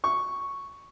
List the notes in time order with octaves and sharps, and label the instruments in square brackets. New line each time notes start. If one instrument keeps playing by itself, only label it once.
[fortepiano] C#6